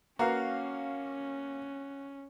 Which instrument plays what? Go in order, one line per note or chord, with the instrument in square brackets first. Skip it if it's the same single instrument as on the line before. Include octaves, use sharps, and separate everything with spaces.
[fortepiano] A#3 F5 [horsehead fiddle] C#4 [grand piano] F#4 [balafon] B4 A#5